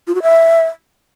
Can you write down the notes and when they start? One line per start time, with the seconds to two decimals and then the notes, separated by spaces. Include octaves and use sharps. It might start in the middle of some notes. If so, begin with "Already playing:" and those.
0.08 F4
0.15 F#4
0.22 E5